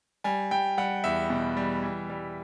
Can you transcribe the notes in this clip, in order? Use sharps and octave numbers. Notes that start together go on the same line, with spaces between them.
G3 G#5
G3 G5
G3 F#5
E2 E5
B2
G3
E3
G3